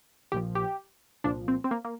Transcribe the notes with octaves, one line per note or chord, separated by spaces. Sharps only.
A#1 A#2 F3 G4
G4
C2 A#2 F3 D4
C4
C4
A#3
A#3